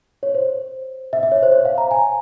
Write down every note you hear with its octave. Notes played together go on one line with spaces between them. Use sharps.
C#5
C5
E5
E5
C#5
C5
C#5
F5
A#5
G#5